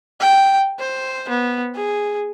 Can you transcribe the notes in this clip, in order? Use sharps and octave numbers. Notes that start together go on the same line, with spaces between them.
G5
C5
B3
G#4